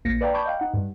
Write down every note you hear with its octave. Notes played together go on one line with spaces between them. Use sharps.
A#1 A#3 A#6 C#7
B4 D5 F5 G5 A#5
A5 B5 C#6 D6 G6 G#6
D#5 F5 G5
D#4 F#5
G2